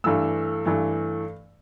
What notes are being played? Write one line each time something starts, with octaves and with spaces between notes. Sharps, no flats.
G2 E3 A3 E6
G2 E3 A3